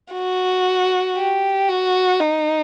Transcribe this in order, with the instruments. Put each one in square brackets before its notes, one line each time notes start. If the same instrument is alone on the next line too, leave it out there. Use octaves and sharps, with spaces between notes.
[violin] F#4
G4
F#4
D#4